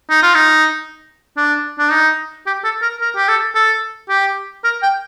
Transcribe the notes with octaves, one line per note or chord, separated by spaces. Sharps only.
D#4
F4
D#4
D4
D4
D#4
G4
A4
A#4
A#4
G4
A4
A4
G4
A#4
G5